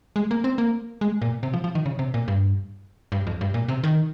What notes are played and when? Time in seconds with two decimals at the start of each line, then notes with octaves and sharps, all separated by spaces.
0.16 G#3
0.31 A#3
0.44 C4
0.58 A#3
1.01 G#3
1.22 A#2
1.43 C3
1.53 F3
1.64 F3
1.75 D#3
1.86 C#3
1.99 C3
2.14 A#2
2.28 G2
3.12 G2
3.27 F2
3.41 G2
3.54 A#2
3.68 C3
3.84 D#3